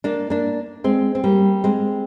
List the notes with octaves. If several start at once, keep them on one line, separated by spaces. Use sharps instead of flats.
A#3 D4
A#3 D4
G#3 C4
C4
G3 A#3
G#3 C4